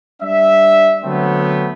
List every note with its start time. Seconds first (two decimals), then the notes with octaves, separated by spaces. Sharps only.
0.23 G3 D4 E5
1.05 D3 F#3 A3 B3 C4